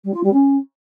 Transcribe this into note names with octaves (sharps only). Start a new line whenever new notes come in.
G3
F4
G3
C#4